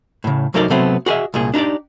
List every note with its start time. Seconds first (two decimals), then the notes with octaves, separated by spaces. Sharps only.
0.24 A2 C#3
0.54 C2 F#3 A3 D#4 A#4 D5
0.70 C3 F#3 A3 B3 C4
1.06 F#4 G#4 A#4 D#5 E5
1.34 C2 A#2 G#4
1.54 D4 D#4 F#4 G4 D5